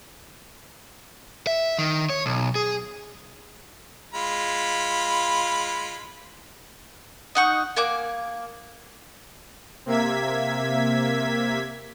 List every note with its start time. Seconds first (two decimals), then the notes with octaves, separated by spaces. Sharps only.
1.47 E5
1.79 D#3
2.10 C#5
2.26 B1
2.55 G#4
4.14 G#3 F4 B5
7.35 D#4 F#5 C#6
7.76 A#3 G#5 D6 F#6
9.86 C3 A#3 E5 G#6 B6